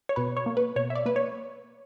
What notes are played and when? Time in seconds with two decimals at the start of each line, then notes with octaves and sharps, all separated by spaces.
0.09 C#5
0.16 B2 B4
0.37 C#5
0.46 A#3
0.57 B4
0.76 B2 C#5
0.90 E5
0.95 D5
1.06 A#3 B4
1.16 C#5